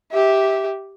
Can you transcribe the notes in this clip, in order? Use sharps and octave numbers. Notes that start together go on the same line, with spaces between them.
G4 E5